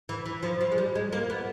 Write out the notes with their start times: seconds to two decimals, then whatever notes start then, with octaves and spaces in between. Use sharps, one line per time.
0.09 E3
0.26 E3
0.43 F3
0.61 F3
0.72 G#3
0.78 G3
0.95 G#3
1.13 A#3
1.30 B3